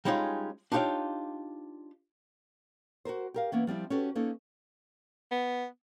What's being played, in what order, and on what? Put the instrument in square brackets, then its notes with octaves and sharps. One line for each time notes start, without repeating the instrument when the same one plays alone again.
[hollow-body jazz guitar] G3 G#3 C#4 D#4 F4
D4 D#4 F4 G4 C#5 F5
[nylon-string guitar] F#4 G4 A#4 C5
G4 A#4 F5
E3 A#3 B3 C#4
F3 G3 C4 E4
C#4 F#4 G4 A4 B4 C#5
A#3 C#4 D#4 A4
[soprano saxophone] B3